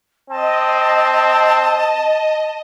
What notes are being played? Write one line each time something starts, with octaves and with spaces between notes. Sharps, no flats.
C4 D#5 A5